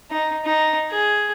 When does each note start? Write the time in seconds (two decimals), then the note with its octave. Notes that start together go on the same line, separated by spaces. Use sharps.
0.11 D#4
0.45 D#4
0.91 G#4